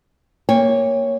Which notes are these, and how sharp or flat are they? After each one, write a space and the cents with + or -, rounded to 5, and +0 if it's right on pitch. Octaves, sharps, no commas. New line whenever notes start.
A#3 +0 C#5 +0 G5 +35